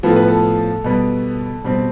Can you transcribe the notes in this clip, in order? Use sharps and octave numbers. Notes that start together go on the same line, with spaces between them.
A2 F3 B3 A4
B4
A4
B2 G3 B3
B2 G3 C4